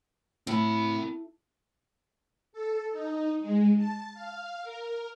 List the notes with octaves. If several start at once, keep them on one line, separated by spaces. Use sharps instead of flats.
A2 C4 B5
A4
D#4
G#3
A5
F5
A#4